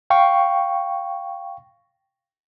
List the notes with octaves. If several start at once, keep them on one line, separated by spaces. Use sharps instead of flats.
F5 G5 C#6